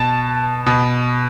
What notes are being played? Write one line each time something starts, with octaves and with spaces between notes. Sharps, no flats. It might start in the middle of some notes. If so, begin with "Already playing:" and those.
Already playing: B2 A5
B2